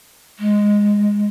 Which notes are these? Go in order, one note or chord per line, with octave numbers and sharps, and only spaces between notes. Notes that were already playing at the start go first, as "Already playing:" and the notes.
G#3